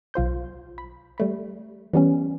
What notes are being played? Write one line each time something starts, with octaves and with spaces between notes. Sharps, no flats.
B1 F4 C5 G6
B5
G3 A3 B5
E3 G3 B3 C#4